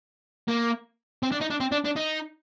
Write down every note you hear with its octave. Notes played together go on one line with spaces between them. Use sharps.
A#3
C4
D4
D#4
D4
C4
D4
D4
D#4